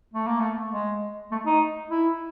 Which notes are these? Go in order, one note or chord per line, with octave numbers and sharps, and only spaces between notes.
A3
A#3
A3
G#3
A3
D#4
E4